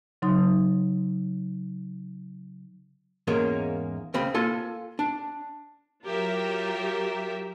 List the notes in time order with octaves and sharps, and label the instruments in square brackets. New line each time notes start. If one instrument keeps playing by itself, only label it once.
[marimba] C#3 F#3 D#4 C6 D#6
[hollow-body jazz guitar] E2 G#2 G#3 A#3 C#4
C#2 C#3 C4 B5
A#3 F4 A4 G#5
D4
[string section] F#3 F4 G4 A#4 E5